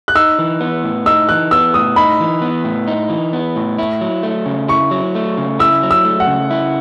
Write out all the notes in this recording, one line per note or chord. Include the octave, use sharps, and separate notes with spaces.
F#6
D#4 E6
E3
B3
A2
D#4 E6
E3 F#6
B3 E6
A2 D#6
D#4 B5
E3
B3
A2
D#4
E3
B3
A2
E4
F#3
A3
C#3
E4 C#6
F#3
A3
C#3
E4 E6
F#3
E6
A3
F#5
C#3
E4